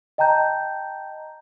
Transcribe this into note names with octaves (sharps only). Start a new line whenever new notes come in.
D#5 G5 A5 A#5 G6